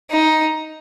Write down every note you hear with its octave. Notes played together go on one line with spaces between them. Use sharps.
D#4